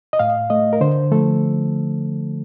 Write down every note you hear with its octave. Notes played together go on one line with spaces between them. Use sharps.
D#5
A2 F5
A3 D#5
A#4
D3 C5
F3 A3 A4